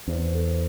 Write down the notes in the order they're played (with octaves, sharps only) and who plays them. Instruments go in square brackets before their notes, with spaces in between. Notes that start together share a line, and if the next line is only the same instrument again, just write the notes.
[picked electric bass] E2 [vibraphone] C5
[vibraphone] A4